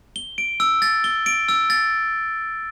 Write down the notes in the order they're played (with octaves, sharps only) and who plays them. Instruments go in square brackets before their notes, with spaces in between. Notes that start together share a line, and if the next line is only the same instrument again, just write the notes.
[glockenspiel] G7
D7
E6
A6
G7
D7
E6
A6